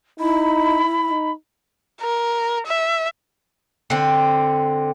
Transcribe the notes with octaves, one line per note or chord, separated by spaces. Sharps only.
D#4 E4 B5
D#4
A#4
E5
D3 C4